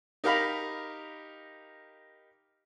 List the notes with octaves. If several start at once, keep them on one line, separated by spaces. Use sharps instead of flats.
D#4 G4 A#4 F5 A#5 B5